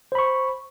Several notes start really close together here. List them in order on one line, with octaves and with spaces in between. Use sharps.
C5 B5 C#6